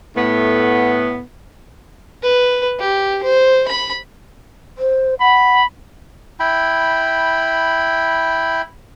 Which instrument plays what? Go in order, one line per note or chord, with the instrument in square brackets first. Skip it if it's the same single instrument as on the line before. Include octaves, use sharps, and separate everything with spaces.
[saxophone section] A2 A3 B3
[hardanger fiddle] B4
G4
C5
B5
[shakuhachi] C5
[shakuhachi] F#5 [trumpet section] B5
[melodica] E4 G5 B5